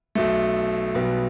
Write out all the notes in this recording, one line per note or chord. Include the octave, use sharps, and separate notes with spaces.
B1 B2 A3
B1 B2 G3 B3